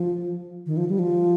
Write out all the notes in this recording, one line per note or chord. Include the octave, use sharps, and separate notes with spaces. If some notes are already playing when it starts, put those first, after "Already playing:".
Already playing: F3
D#3
F3
G3
F3